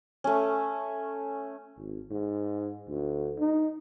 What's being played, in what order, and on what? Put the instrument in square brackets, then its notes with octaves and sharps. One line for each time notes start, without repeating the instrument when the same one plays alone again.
[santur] A3 C#4
[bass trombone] G#1
G#2
D2
D#4